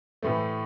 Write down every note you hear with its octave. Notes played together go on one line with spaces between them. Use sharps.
A2 E3 A3